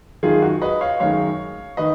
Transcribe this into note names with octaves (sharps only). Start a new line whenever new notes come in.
F#2 D#3 G#3 F4 G#4
F#4
B4 D#5
C#5 F5
F#2 D#3 G#3 C#5 F5
D#3 B4 D#5